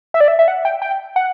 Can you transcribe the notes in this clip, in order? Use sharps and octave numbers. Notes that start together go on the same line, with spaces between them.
E5
D5
E5
E5
F#5
G5
G5
F#5